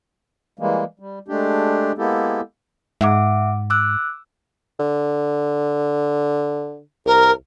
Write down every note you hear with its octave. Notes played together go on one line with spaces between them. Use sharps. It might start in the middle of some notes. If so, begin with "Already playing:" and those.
E3 G3 G#3 A#3
G3
G#3 A3 D4 G4
G#3 A#3 B3 E4 G4 A4
G#2 E5 F#5 D6
D6 E6 F#6
D3
C2 A#4